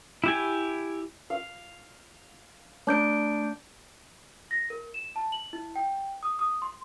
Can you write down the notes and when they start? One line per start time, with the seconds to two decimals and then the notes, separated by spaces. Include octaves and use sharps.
0.24 E4 G4 G#5
1.30 F5
2.87 A3 D4 G6 D7
4.51 A#6
4.70 A#4
4.94 E7
5.16 A5
5.32 F#7
5.53 E4
5.76 G5
6.23 D#6
6.39 D#6
6.62 C6